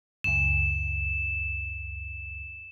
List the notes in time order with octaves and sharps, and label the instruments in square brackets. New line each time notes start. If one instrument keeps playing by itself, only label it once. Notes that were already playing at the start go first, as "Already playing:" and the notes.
[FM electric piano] C#2 F#2 [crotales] E7